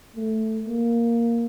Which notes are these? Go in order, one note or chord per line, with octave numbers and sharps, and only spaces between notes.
A3
A#3